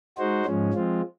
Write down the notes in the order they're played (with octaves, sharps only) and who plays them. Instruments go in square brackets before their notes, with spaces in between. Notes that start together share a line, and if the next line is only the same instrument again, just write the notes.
[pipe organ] G#3 D#4 F#4 C5
G#2 F3 G#3 C#4
F3 G#3 C4 F4